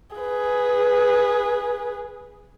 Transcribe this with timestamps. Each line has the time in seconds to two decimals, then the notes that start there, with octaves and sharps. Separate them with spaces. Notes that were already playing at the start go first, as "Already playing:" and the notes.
0.16 G#4 B4